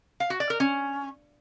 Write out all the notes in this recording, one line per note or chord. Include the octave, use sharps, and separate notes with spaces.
F5
F#4
D5
A#4
C#4